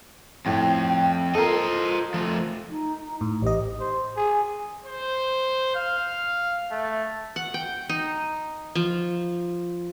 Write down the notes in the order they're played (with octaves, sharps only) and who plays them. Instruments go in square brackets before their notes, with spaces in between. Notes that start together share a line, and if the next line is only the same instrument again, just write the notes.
[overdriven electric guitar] F2 [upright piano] A2 [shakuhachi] G5
[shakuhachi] F4 [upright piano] A4 A#4 [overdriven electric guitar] C5 D#5
[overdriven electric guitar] F3 A3
[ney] D#4
[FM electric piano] A2
[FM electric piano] A1 D#5 [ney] G4
[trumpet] C5
G#4
C5
F5
A3
[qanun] F#5
G5
D#4
F3